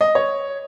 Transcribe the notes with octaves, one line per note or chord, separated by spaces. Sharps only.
D#5
C#5